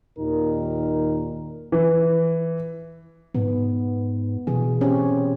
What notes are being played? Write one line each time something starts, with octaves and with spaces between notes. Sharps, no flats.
D#2 A#2 D#3 A#4
E3
G#2 B3
B2 E3 G#4
C4 C#4 G4